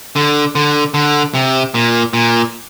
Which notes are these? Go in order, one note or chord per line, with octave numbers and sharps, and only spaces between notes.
D3
D3
D3
C3
A#2
A#2